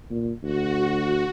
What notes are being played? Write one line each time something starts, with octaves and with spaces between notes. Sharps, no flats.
A#2
D2 F#4